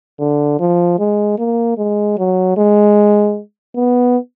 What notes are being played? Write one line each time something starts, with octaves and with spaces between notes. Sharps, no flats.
D3
F3
G#3
A#3
G#3
F#3
G#3
B3